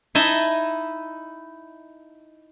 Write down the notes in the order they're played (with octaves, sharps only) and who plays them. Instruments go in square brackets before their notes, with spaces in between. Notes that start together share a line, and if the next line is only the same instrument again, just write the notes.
[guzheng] D#4 E4 D#5 A5